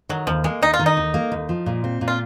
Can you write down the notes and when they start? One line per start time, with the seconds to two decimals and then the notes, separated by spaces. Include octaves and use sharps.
0.09 D#3 F#3
0.27 D#2 F3
0.44 G#3 A#3
0.62 D#2 D#4
0.74 F4
0.79 D#3
0.86 D#4
0.97 D#2
1.14 A#3
1.32 D#2
1.49 F3
1.66 A#2
1.84 C4
2.01 A#2
2.08 F4